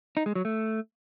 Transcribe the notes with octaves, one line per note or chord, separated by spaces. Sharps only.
D#4
G#3
F#3
A3